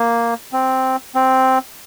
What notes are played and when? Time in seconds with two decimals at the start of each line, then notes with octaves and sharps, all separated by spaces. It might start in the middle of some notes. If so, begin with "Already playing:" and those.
Already playing: A#3
0.53 C4
1.15 C4